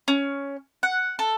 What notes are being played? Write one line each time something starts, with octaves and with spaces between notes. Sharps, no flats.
C#4
F#5
A4